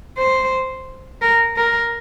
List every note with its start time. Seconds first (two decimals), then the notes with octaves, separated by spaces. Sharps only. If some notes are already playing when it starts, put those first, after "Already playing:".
0.18 C5
1.22 A#4
1.56 A#4